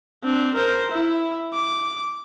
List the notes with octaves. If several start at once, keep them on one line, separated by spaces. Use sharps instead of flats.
C4 D4
A#4 C5
E4
D6